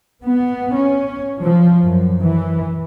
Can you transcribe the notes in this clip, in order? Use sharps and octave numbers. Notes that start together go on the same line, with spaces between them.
B3
C#4
F3
F#2
E3